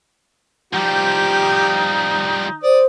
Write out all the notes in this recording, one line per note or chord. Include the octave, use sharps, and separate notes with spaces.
F3 G3 D#4 G4
C5 D5 D#6